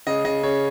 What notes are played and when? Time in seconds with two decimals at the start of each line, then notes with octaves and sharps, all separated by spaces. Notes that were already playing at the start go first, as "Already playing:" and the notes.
0.07 C#3 D#5
0.25 C#3 D#5
0.43 C#3 C#5